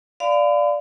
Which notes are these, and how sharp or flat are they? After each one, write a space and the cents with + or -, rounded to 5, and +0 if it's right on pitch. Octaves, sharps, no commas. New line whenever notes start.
D5 +0 F5 +0 B5 +45